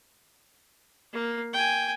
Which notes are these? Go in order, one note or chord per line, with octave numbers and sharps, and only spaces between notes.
A#3
G5 G#5